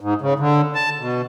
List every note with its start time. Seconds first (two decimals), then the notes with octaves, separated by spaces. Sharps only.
0.01 G#2
0.22 C#3
0.39 D3
0.75 A5
0.99 B2